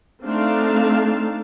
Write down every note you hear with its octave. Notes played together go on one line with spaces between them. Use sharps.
A3 C4 D4 D#4 F5 A5